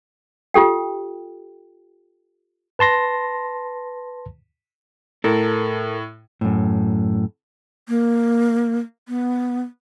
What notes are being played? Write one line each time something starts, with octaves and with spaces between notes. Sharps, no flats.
F4 G4 A4 G5
B4 A5 C6 A#6
A2 A4 A#4
F#2 A2
A#3
B3